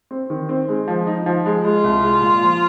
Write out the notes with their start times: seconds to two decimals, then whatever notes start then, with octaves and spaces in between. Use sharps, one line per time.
0.11 C4
0.30 D#3
0.49 C4
0.69 G#3
0.88 F3
1.07 D#4
1.26 F3
1.46 G#3
1.65 G#3 F4
1.84 C2
2.03 G#3
2.22 A#2
2.42 F3